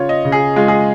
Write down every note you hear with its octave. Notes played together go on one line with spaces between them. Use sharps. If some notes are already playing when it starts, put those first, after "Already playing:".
Already playing: C#3 F4 C#5
D#5
C#3
G#4
G#3 F4
G#4